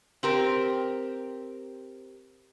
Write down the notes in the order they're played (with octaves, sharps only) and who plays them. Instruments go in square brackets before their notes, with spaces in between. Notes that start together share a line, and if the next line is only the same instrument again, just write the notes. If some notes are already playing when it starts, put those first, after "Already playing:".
[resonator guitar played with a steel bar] C4 G4 A#4